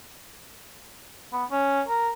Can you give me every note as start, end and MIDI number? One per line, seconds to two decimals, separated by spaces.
1.32 1.44 59
1.51 1.81 61
1.88 2.10 70